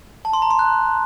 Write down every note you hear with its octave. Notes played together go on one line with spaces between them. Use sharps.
A5
C6
A#5
C6
F#6